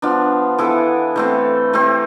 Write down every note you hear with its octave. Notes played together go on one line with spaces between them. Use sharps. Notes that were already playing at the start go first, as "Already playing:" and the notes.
F3 B3 D4
E3 B3 E4 A4
E3 A3 C4
E3 A3 C4 G4